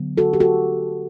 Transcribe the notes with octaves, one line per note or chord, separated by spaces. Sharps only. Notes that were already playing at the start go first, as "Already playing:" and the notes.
Already playing: D3 F#3 B3
F#4 A4
G4
F#4 A4